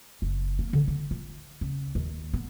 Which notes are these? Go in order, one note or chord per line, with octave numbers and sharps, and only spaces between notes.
F#1
A#3
D3
D3
F4
C#2
D#2
B3